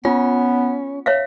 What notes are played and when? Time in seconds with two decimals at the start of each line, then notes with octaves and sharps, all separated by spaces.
0.05 B3 C#4 F4
1.06 C#5 E5 F5